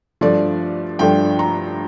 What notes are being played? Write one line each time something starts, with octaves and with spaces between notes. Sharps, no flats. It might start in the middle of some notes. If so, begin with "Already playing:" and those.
G2 F3 A3 D4 D5
G2 F3 A3 D4 G5
A#5